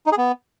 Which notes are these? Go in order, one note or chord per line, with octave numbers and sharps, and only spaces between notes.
D#4
G#4
B3